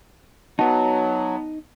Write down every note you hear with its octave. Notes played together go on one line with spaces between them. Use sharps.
F#3 B3 D#4 F#4 F#5 A5